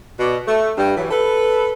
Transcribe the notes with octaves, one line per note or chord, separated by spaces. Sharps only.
B2 D5
A3
G2 G3
E3 F#3
A4 B4